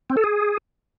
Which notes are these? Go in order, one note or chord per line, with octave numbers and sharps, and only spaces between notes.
C4
A4
G#4